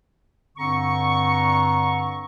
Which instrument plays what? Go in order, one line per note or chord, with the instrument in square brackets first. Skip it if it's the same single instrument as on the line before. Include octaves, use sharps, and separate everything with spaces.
[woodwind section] G2 D3 C4 A#5 C#6